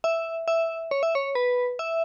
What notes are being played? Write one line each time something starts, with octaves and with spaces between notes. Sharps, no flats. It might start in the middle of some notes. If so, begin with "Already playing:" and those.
E5
E5
C#5
E5
C#5
B4
E5